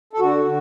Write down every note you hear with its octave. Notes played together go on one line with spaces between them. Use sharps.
A4
D3 F#4
D3